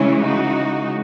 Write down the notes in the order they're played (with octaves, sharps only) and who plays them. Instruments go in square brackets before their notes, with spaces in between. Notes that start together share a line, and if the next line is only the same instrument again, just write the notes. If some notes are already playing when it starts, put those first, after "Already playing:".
Already playing: [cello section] C#3 E3 G#3 C#4 E4
D#4 F#4